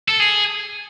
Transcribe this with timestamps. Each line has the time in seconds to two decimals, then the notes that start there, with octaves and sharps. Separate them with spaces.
0.08 A4
0.20 G#4